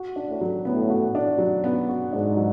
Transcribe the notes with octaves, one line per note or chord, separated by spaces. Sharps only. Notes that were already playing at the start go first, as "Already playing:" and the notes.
Already playing: F#4
D4
A2
F#3
A2 B3
F#4
D4
F#3
B3
F#4
G#2 D4
F#3